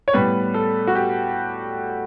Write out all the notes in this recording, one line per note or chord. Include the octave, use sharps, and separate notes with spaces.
C#5
A2 G3 B3 B4
A4
F#4
G4